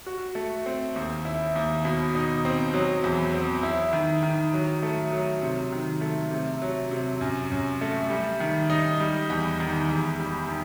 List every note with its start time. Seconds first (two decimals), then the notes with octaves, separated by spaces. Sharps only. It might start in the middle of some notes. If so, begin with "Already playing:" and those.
0.07 F#4
0.35 A3
0.66 C4
0.96 D#2
1.25 E4
1.56 D#2
1.85 B2
2.15 D#4
2.45 C4
2.74 F#3
3.04 E2
3.34 C4
3.63 E4
3.93 D#3
4.23 D#3
4.54 F#3
4.83 A3
5.12 F#3
5.42 C3
5.72 D#3
6.01 A3
6.31 C3
6.62 F#3
6.91 C3
7.21 F#2
7.52 F#2
7.81 A3
8.10 G3
8.40 D#3
8.70 D#4
9.00 G3
9.30 E2
9.60 D#3
9.89 E2
10.19 G3
10.48 D#3